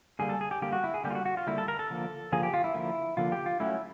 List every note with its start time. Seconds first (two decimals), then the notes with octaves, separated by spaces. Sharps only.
0.19 D3 G3 A#3 G#4
0.29 A4
0.41 G#4
0.51 G4
0.62 D3 G3 A#3 G4
0.73 F#4
0.84 E4
0.94 G#4
1.04 D3 G3 A#3 G4
1.11 F4
1.15 F#4
1.26 F#4
1.37 F4
1.47 D3 G3 A#3 E4
1.58 A4
1.68 A#4
1.79 A4
1.90 D3 F3 A#3
2.32 D3 F3 A#3 G#4
2.43 G4
2.54 F4
2.64 E4
2.74 D3 F3 A#3
3.17 D3 F3 A#3 F4
3.32 G4
3.46 F4
3.60 F#3 A3 C#4 E4